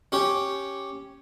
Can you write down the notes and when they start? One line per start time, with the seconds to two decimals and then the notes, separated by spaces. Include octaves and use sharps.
0.12 C#4 G4 C#5